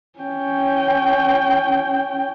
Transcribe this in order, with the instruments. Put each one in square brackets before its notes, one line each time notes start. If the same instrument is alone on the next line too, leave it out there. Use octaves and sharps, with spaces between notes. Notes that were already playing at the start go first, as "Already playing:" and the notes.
[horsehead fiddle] C#4 G5